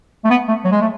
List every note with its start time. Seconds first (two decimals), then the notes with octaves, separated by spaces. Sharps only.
0.25 A3
0.30 B3
0.48 A3
0.64 F#3
0.72 G#3
0.81 A3